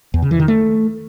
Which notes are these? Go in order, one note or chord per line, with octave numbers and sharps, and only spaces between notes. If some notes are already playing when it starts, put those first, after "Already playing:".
E2
C#3
E3
D#3
A3